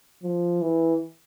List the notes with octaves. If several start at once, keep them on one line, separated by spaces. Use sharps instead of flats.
F3
E3